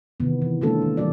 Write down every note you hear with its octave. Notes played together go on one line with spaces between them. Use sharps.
C3 D#3 E3 B3
E3
D3 G#3 A#3 C#4 F4 A4
D#3
B2 E3 G3 F4 D5